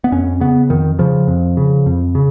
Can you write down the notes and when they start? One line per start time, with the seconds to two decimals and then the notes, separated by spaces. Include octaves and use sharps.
0.04 B3
0.12 F2 C#4
0.40 C#3 B3
0.70 F2 D#3
0.99 C#3 F3
1.28 F2
1.57 C#3
1.86 F2
2.15 C#3